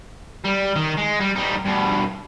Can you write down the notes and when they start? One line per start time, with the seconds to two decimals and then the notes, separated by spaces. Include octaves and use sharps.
0.45 G3
0.76 D#3
0.97 G#3
1.20 G3
1.36 G3 D#4
1.66 G2 B2